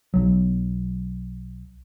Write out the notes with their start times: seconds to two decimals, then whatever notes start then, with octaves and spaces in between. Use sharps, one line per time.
0.14 B1 F#3